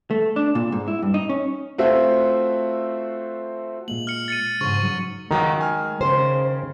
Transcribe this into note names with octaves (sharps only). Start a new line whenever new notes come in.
A3
D4
A#2
G#2
E4
G2
D#4
C#4
A3 C4 F4 F#4 C5 E5
A#2 G#3 A#3 F#7
F6 C#7 F#7
A6 C#7 D#7
G#2 C#3 F3 C5 C#6
F#3 D#4
C#2 D#3 F#3 G#3 A#5
G#5 F6
C#3 C5